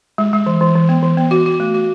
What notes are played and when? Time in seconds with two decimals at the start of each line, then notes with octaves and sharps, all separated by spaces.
0.18 G#3
0.33 G#3
0.46 E3
0.61 E3
0.76 E3
0.89 B3
1.03 E3
1.17 B3
1.31 F#4
1.46 F#4
1.60 A3
1.74 F#4